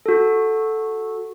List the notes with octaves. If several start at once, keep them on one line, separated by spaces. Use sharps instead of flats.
F#4 A4